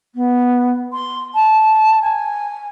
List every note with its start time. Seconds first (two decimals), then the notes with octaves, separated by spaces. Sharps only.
0.15 B3
0.92 C6
1.34 A5
2.01 G#5